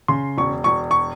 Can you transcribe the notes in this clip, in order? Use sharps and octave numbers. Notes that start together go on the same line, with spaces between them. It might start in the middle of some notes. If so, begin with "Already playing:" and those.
C#3 C6
E1 C#6
E1 C#6
C#6